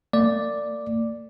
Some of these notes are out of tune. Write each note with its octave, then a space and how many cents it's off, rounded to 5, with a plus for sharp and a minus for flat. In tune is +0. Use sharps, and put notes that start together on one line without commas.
A#3 -45 D5 +0